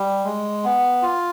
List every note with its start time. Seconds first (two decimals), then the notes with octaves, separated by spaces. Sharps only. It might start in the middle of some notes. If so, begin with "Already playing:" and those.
Already playing: G3
0.24 G#3
0.64 B3
1.02 F4